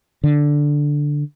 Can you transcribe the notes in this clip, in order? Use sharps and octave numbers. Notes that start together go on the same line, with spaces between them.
D3